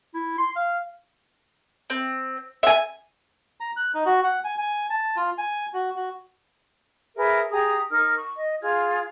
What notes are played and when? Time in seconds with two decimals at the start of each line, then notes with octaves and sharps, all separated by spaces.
0.14 E4
0.38 C6
0.56 F5
1.90 C4
2.63 E5 G#5
3.60 A#5
3.77 F#6
3.94 D#4
4.06 F#4
4.24 F#5
4.44 G#5
4.58 G#5
4.90 A5
5.17 F4
5.38 G#5
5.74 F#4
5.96 F#4
7.16 G#4 A#4 B4 E5
7.51 G4 G#4 A#5 D#6
7.90 D#4 A#4 F6
8.16 C#6
8.36 D#5
8.62 F4 G#4 F6 G#6